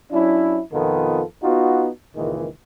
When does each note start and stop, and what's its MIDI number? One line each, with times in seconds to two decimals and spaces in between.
0.11 0.60 54
0.11 0.60 61
0.11 0.60 62
0.11 0.60 64
0.72 1.22 41
0.72 1.22 47
0.72 1.22 51
0.72 1.22 59
0.72 1.22 65
0.72 1.22 69
1.42 1.88 59
1.42 1.88 63
1.42 1.88 65
1.42 1.88 66
2.15 2.47 37
2.15 2.47 46
2.15 2.47 51
2.15 2.47 52
2.15 2.47 56
2.15 2.47 58